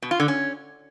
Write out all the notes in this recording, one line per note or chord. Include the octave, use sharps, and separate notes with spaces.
B2
F4
D3
C#4